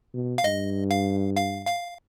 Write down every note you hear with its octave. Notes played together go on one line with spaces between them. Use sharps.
B2
F5
G2 D#5
F5
F5
F5